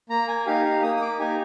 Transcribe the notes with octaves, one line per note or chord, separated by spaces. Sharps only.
A#3 A#5
G#5
D#4 G4 F5
F5
A#3 D#6
D#6
D6
D#4 G4 G#5